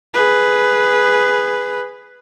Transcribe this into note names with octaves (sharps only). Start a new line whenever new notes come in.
G#4 B4